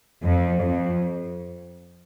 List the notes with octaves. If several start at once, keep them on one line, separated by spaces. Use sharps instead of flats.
F2
F2